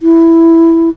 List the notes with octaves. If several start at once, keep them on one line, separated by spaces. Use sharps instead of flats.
E4